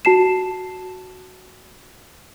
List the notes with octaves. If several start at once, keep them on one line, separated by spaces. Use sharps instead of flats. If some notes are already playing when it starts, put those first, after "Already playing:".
F#4 A5 C7 E7